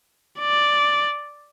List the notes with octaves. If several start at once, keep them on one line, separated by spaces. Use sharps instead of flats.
D5